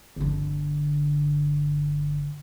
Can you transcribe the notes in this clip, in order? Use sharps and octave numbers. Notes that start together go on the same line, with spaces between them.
G1 D3